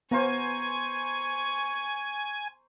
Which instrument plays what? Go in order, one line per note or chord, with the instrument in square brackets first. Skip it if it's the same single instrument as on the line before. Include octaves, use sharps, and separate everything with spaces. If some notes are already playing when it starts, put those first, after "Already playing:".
[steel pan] B3 F5 [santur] C5 A#5 [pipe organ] G#5 [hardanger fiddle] C#6